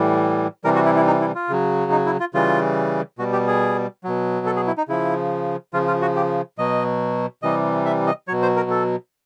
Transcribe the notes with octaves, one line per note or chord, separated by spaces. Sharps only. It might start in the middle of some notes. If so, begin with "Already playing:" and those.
Already playing: A2 E3 G3
C3 E3 G3 A#4
F#4
E4
E4
D#4
E4
F4
C#3 F#3
D#4
E4
F4
C#3 E3 G3 F4
B2 G3 F#4
G4
G#4
B2 F#3
A4
G#4
E4
D#4
C#3 F3 E4
C#3 F3 F4
F4
F#4
G4
B2 F#3 D#5
C3 E3 G3 D#5
E5
D#5
B2 F#3 C#5
C5
A#4
A4